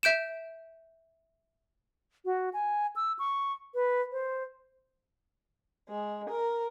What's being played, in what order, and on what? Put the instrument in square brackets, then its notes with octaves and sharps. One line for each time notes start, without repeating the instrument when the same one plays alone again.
[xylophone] E5 G6 D7 E7
[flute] F#4
G#5
E6
C#6
B4
C5
[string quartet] G#3
A#4